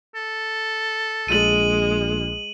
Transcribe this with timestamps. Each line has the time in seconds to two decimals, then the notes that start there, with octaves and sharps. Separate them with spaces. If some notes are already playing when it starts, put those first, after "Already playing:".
0.15 A4
1.28 A#1 G#3 D#7 F#7